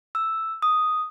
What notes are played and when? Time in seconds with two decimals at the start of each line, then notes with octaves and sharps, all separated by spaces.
0.15 E6
0.62 D#6